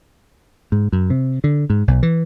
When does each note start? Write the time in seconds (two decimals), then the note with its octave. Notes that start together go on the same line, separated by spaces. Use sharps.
0.72 G#2
0.92 F#2
1.10 C3
1.44 D3
1.70 G#2
1.88 B1
2.03 E3